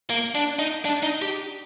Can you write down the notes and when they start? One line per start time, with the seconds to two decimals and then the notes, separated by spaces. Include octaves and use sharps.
0.10 A#3
0.35 D4
0.59 D#4
0.85 D4
1.03 D#4
1.22 G4